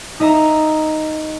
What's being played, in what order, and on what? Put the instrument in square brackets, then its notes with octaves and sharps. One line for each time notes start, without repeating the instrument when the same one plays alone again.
[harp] D#4 D#5 E5 A#5